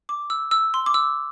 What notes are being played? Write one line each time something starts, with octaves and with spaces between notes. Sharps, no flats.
D6
E6
E6
C6
D6
E6